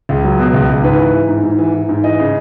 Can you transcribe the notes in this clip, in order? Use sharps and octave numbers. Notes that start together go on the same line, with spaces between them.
C#2
F#3
B2
C#2
C#2
G#2 B4
E3
E3
G#2
G#2
E3
E3
G#2
E3 D#5
C#3